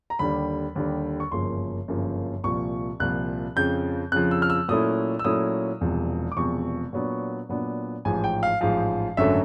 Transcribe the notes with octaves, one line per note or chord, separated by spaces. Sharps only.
A#5
D#2 D3 G3 B5
D#2 D3 G3
C#6
G1 F#2 C#3 F3 A#3 C6
G1 F#2 C#3 F3 A#3
C2 A#2 F3 C#6
C2 A#2 F3 F#6
F2 C#3 F3 G6
F2 C#3 F3 F#6
E6
F6
E6
A#2 F#3 A3 C#4 E4 D#6
E6
A#2 F#3 A3 C#4 E4 D#6
E1 E2 C3 F3
D6
E1 E2 C3 F3 C#6
A#2 F#3 B3 D4
A#2 F#3 B3 D4
A1 G#2 F3 G#5
G5
F5
A1 G#2 F3 F5
G#1 F#2 D3 F#3 A3 E5